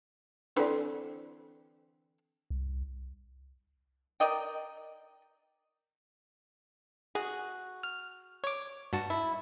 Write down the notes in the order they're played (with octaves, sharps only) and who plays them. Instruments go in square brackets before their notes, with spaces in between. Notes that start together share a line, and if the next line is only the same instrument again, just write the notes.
[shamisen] D3 E3 C4 [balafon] D4 A4 D5
[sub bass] C2
[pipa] A#4 D5 D#5 G5
[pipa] F#4 [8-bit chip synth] G#4
[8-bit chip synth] F6
C#5 D6
G2 F#4 A5
[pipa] E4